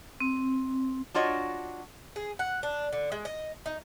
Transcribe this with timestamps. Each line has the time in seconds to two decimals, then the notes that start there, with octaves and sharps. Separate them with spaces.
0.20 C4
1.14 D4 F4 F#4 C#5 D#5
2.16 G#4
2.39 F#5
2.63 D4
2.92 D3
3.12 G#3
3.25 D#5
3.66 D#4